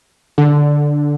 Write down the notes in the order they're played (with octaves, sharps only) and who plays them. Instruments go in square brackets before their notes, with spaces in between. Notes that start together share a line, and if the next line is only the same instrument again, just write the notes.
[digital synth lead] D3